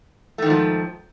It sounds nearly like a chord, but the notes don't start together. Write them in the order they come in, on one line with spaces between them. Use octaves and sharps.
A3 D#3 G#2 F3